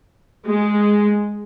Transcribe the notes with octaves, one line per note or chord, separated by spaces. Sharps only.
G#3